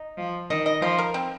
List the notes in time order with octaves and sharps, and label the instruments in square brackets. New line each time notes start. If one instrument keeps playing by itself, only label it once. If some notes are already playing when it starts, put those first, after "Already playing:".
Already playing: [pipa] D#4
[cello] F3
[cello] D#3 [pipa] D#5
[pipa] D#5
[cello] F3 [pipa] C5
[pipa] A#4
C4